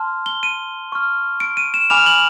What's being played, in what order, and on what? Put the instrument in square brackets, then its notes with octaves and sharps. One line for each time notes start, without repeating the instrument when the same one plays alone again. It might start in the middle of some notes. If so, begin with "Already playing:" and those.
Already playing: [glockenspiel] A5 C6 F6
G7
D#7
C#6 F6
D7
D#7
E7
G#5 B5 D6 F6 F7
F#7